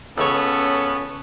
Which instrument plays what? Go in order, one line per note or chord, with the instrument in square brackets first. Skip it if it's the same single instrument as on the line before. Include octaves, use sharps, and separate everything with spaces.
[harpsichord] C#2 C#5 [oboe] B3 [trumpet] C#4 [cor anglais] A4